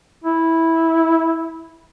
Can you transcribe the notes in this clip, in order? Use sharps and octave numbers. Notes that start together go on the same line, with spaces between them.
E4